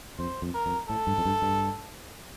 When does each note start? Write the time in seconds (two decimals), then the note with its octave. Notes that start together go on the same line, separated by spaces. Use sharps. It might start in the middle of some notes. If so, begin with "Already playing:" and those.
0.19 F2 C5
0.42 F2
0.54 A#4
0.66 F2
0.89 A2 A4
1.07 G2
1.18 F2
1.25 G2
1.42 G2